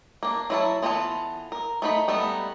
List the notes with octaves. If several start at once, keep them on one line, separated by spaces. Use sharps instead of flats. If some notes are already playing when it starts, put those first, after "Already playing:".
A#3 D4
F#3 E4 A5
E3 B3 F4 A4 A5
A#4
A3 D#4 B5
G3 A3 B3 D#4